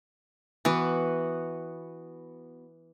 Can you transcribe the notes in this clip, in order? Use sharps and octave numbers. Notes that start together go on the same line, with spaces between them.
E3 B3 F#4